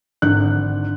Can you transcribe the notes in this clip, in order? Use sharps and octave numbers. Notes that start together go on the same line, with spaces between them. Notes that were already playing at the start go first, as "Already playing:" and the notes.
G#1 D3 F#6